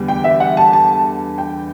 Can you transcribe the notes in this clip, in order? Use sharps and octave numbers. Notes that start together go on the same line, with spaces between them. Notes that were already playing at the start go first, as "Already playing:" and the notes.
Already playing: E2 D3 G3
G5
E5
F#5
A5
A5
G5